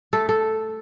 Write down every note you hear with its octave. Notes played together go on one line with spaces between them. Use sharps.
A3 A4
A4